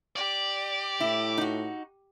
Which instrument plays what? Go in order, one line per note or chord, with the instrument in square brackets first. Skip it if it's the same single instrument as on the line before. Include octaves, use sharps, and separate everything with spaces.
[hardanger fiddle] G4 [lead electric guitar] D5
[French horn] A2 [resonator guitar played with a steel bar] E4
[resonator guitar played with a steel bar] D#4 F#4